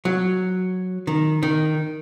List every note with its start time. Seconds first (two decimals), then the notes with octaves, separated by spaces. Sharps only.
0.05 F#3
1.07 D#3
1.43 D#3